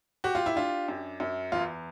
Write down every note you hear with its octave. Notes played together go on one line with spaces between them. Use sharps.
F#4 G4
F4
E4
D4 F4
F#2
F#2
E2 F4